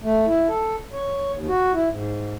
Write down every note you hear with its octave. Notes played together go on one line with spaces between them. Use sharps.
A3
E4
A4
C#5
D#2
F#4
E4
G#2